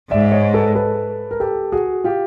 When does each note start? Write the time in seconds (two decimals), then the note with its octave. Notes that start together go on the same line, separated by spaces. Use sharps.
0.11 G#2 D5 E5
0.32 C#5 D#5
0.53 A4 B4
0.75 A4 B4
1.31 A#4
1.40 G4 A4
1.72 F#4 G#4
2.04 F4 G4